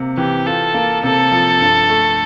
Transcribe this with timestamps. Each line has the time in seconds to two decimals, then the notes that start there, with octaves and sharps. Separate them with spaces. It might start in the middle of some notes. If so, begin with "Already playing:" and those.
Already playing: C3 A#3
0.17 E3 G4
0.46 F4 A4
0.74 A#3
1.03 C3 A4
1.32 F3
1.61 G2
1.89 A3